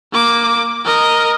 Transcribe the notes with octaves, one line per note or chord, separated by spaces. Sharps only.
A#3 D6
A#4 D#5